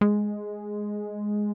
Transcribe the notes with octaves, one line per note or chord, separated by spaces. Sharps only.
G#3